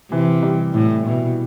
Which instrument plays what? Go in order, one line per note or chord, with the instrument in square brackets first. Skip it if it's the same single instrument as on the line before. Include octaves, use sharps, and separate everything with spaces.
[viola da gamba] C3 [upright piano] E3
[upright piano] G3
[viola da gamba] A2 [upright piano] E4
[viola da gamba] B2 [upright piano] E4